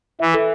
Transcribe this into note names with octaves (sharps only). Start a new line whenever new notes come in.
E3 E5
A4